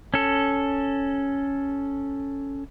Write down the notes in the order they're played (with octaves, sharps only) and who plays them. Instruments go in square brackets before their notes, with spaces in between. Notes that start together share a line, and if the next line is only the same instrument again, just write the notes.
[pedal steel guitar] C#4 A4